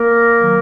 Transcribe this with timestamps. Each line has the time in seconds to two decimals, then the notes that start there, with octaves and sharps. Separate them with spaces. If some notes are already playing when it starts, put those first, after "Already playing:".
Already playing: A#3 A#4
0.39 D#3 F#3